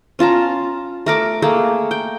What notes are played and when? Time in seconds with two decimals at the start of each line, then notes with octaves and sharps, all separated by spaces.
0.19 C#4 F4 A5 A#5
1.06 A3 A#4 D6
1.42 A3 A#3 G#4
1.91 G5